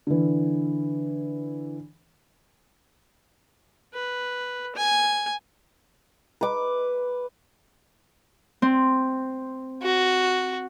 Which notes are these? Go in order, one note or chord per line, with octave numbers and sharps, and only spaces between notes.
D3 E3
B4
G#5
B4 D6
C4
F#4